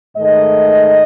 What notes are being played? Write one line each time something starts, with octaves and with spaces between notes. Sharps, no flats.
G#2 D#3 A3 D#5